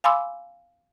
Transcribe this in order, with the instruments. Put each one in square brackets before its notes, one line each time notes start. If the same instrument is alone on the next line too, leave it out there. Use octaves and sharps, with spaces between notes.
[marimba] F5 G#5 B5 C6 D6 E6